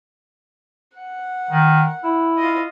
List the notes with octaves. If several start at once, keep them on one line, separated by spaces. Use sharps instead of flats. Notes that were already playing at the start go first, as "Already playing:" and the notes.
F#5
D#3
E4
F4 D#5